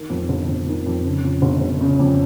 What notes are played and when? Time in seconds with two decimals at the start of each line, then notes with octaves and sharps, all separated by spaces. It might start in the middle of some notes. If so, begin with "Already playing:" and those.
Already playing: D#3
0.10 F2
0.29 G1
0.49 G1
0.67 D#3
0.86 F2
1.05 C#3
1.24 F2
1.42 G1
1.61 G1
1.81 C#3
1.99 F2